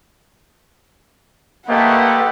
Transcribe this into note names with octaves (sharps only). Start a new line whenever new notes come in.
A3 A#3 G4 B4 C5 D#5 F#5